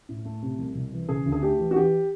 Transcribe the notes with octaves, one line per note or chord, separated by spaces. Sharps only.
A2
A3
C3
C2
C2
E3
C#3 G#4
D2
G#4
A3 G4
E3
F#4
E3 G4